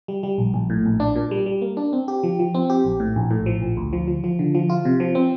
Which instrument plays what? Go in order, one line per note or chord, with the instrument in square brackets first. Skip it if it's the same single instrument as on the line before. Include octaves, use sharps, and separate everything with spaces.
[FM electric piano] G3
G3
A#1
A#1
A2
A#1
D4
A#2
G3
G3
A#3
D4
C4
G4
F3
F3
C4
G4
A#1
A2
A#1
A2
F3
A#1
D2
F3
F3
F3
D3
F3
F4
C3
F3
C4